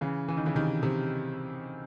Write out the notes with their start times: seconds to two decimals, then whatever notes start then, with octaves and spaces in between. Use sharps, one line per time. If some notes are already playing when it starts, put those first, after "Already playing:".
0.01 C#3 E3
0.28 E3
0.37 D#3
0.46 C#3 E3
0.55 C3 D#3
0.83 C3